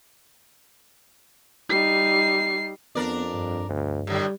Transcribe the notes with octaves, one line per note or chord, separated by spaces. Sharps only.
G3 D#4 C7
F2 B3 D4 A#4 D5
G2
D2
A2 D3 G3